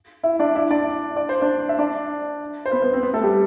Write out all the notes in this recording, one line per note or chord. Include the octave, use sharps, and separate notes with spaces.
E4 E5
D4 D5
E4 E5
D4 D5
D5
C5
D4 D5
E5
D4 D5
C5
B3 B4
B3 B4
C4 C5
B3 B4
A3 A4
G3 G4